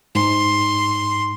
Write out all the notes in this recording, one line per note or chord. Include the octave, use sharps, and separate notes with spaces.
G#2 C6